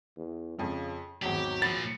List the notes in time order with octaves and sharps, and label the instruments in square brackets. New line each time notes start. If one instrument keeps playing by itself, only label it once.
[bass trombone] E2
[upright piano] F2 F3 [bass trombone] C#3
[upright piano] G#1 E2 [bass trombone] F#3 [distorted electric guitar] G4
[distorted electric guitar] A#2 F3 [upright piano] B5 [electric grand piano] A6